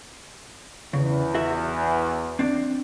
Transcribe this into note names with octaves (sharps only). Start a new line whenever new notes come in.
E2 C#3
F#4 E5
C4 D4